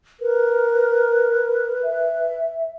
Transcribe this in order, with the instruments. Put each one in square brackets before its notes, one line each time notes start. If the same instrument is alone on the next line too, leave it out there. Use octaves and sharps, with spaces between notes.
[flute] A#4 [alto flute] B4
[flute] E5